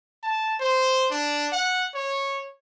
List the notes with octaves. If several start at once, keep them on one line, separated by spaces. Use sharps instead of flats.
A5
C5
D4
F#5
C#5